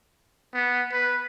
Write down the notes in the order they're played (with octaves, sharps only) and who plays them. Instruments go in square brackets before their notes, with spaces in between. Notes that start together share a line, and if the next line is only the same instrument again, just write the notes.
[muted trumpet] B3
B4